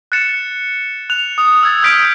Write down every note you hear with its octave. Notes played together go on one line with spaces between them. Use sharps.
F#6 A6 C#7 E7
F#6 F7
D#6
E6 G#6 A6
D#6 F6 G6 B6 D7